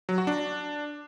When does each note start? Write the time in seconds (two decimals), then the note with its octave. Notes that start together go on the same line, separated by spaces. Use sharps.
0.09 F#3
0.18 F#4
0.27 D4